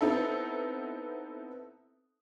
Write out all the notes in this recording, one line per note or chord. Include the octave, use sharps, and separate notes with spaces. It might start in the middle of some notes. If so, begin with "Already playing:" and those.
B3 C4 D#4 E4 A4